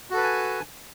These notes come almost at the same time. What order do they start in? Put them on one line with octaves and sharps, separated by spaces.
F#4 A4 B4 A5 G#5